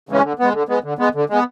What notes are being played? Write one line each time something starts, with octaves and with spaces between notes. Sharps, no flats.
C#3 E3 G#3 C#4
D3
G#3 B3
D3
G#3 B3
D3
G#3 B3
D3
G#3 B3